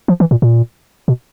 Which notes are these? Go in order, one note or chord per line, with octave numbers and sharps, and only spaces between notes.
F3
E3
A#2
A#2
B2